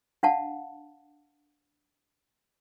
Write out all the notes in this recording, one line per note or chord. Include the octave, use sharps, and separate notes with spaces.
D4 F5 F#5 A5